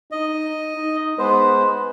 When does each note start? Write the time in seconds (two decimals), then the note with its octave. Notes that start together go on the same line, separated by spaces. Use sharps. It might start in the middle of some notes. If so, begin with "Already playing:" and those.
0.12 D#4 D#5
0.75 D#4
1.18 G#3 B3 B4 C5